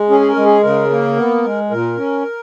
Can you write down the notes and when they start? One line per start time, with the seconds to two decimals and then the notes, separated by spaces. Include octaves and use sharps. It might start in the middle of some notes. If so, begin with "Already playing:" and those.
Already playing: G#3
0.09 C#4 G#4
0.20 G#4
0.28 A#4
0.36 G#3
0.45 G#4
0.63 C#3 A#4
0.90 A#3
1.17 B3
1.44 G#3
1.71 A#2 A#4
1.97 C#4